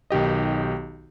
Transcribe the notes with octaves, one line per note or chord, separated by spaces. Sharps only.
B1 D#3 G4 D#5